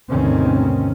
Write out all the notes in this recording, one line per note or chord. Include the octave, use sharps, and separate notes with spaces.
D2 G2 B2 D#3 C4 C#4